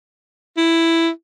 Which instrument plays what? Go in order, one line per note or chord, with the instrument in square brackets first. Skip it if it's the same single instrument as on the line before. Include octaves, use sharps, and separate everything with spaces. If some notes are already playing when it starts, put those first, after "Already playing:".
[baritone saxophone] E4